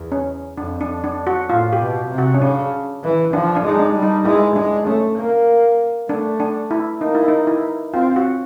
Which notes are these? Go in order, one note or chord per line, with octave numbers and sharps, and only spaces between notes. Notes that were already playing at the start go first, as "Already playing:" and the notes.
Already playing: E2
C#4
F2 D4
D4
D4
F#4
A2 F4
G4
B2
C3
F#4
C#4
C#3 D4
E3
F3 D4
D4
G#3
D#4
D4
G3
D#4
G#3 E4
G#3 D4
A3 C#4
A#3
A3 D4
D4
E4
A#3 D#4
E4
D#4
E4
C4 F4
F#4